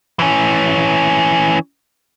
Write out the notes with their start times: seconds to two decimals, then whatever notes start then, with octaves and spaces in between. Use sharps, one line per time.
0.19 E3 C#4